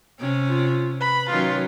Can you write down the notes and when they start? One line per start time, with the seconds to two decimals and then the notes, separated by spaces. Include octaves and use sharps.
0.20 C3 C#4
0.49 F4
1.00 B4 B5
1.29 D#3 F#3 C#4 F4